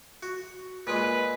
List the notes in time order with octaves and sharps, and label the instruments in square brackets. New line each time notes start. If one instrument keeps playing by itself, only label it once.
[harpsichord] F#4
[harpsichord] A#2 G#3 [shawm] B4